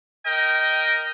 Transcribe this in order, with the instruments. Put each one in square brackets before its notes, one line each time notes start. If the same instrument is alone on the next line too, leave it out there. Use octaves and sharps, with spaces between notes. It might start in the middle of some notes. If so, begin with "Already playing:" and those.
[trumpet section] A#4 D#5 G5